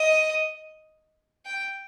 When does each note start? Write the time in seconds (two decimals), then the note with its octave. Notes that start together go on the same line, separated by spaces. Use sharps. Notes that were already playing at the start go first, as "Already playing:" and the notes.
Already playing: D#5
1.45 G5